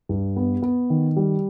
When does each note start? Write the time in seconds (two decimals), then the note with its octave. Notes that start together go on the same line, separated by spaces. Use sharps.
0.09 G2
0.36 B3
0.62 B3
0.90 D#3
1.16 G3